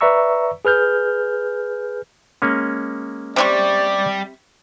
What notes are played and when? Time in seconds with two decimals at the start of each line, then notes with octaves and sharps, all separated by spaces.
0.01 B4 D5 E5 A#5 C#6 E6
0.65 G#4 B4 F6 G6
2.42 G#3 A#3 C#4
3.36 C3 G3 E4 D5 C#6